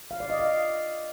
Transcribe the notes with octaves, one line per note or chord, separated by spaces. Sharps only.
F5
D5
D#5
F5